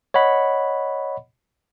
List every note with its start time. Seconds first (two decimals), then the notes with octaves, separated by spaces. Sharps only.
0.14 C#5 D#5 F#5 B5